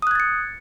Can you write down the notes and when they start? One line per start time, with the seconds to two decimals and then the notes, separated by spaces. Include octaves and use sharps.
0.02 D#6
0.07 F#6
0.11 G#6
0.15 A6
0.20 C#7